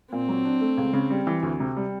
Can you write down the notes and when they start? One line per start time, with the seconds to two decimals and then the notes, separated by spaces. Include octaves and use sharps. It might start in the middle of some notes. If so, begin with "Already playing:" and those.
0.12 A#2 C4
0.29 F#3
0.45 D4
0.61 A3
0.78 C#2
0.93 C#3
1.10 G3
1.27 E3
1.43 D2
1.60 C3
1.77 G3